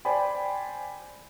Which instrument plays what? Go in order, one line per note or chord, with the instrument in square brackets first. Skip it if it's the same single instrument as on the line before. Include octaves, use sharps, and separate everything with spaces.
[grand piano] C5 D5 G5 G#5 B5